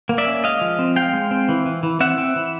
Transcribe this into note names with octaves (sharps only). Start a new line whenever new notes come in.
A#3
D5 E5
C#4
G#3 D#5 F5
F3
C4
G#3 F5 G5
G#3
C4
E3
E3
E3
C4 E5 F#5
C4
E3